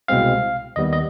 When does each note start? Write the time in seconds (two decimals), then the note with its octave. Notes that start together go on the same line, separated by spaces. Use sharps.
0.08 C2 B2 G#3 C4 F5
0.76 D#2 D#3 G3 B3 D#5
0.93 D#5